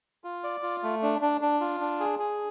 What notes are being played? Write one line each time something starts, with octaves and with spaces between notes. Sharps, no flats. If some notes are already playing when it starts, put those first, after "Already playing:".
F4
D5
F4
A3
D4
D4
D4
F4
D4
G#4
G#4